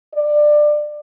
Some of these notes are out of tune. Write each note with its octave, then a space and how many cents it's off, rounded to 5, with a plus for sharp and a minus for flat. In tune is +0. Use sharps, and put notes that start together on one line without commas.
D5 +20